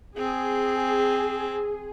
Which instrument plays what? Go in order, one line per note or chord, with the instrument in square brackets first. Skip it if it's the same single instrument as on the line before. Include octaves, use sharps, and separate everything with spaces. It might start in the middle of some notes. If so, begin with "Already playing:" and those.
[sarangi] C4 [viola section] G#4